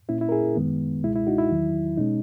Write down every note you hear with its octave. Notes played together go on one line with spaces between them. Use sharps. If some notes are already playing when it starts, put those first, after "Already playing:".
A#2 A#3 C#4 E4
E4
A#4
E4 G#4
F#2 D#3 G#3 B3
C#2 B2 G#3 E4
E4
D#4 F#4
E4
E2 D#3 F#3
B2 G#3 C#4 D#4